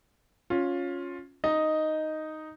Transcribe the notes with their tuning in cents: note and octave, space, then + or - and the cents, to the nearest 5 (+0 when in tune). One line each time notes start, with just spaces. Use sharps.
C#4 +0 F4 +15
D#4 +0 D#5 +0